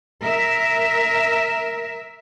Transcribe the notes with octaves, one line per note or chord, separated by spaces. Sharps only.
A#4 E5